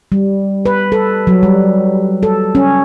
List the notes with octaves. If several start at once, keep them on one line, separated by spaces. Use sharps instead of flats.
G3
B4
A4
F#3
G3
A4
C#4